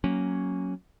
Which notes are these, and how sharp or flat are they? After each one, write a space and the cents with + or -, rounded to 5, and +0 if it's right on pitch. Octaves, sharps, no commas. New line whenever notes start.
F#3 +0 A#3 +0 C#4 +0